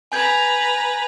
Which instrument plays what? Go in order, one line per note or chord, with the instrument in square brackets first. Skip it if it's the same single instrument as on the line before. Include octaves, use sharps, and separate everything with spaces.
[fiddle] B4 A#5 [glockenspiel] G#5 G6 G#6